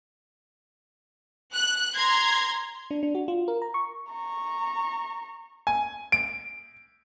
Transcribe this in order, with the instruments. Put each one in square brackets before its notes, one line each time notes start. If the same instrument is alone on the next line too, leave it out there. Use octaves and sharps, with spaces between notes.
[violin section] F#6
A#5 C6 G#6
[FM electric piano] D4
D4
F#4
F4
A#4
A#5
C#6
[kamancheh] A#5 C#6
[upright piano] G#5
D7